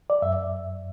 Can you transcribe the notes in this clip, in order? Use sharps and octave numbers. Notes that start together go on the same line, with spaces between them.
D5
F#2 E5